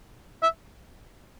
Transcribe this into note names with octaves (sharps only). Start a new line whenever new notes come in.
E5